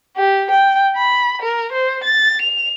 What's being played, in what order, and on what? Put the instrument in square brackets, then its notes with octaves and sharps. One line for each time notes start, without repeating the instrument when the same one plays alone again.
[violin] G4
G5
B5
A#4
C5
A6
F7